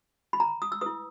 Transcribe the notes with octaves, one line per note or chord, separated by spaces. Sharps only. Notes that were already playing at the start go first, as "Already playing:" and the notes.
B5
A#5
D#6
E6
E4 B4 D#6